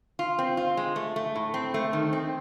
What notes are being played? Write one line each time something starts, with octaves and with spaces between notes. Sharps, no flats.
F4
C4
F4
G#3
A3
A3
A2
C4
A3
D#3
C4